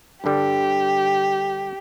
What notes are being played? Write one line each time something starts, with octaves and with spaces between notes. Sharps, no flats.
G2 D3 G3 G4